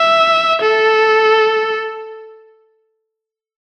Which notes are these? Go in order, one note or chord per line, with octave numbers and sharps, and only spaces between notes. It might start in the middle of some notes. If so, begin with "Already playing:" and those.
Already playing: E5
A4